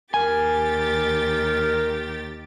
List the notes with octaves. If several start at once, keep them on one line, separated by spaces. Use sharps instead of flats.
D#2 G4 A#4 G#5 A6